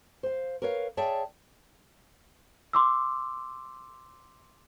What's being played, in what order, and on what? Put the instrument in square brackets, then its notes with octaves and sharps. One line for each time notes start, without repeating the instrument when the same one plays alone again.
[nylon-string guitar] C5 F5
A#4 B4 C#5 F5
G#4 C#5 D5 E5 G5 A5
[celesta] C6 D6 E6